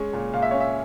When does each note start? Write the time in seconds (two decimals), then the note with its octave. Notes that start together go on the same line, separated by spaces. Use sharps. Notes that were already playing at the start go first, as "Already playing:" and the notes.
Already playing: G#3 C#4 C#5
0.13 A#2
0.33 A#2 F5
0.42 E5
0.51 C#4 C#5
0.60 E5